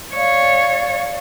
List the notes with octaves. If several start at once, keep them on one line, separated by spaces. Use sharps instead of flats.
C#5 D5 F5